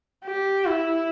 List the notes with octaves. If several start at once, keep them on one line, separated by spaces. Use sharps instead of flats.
G4
E4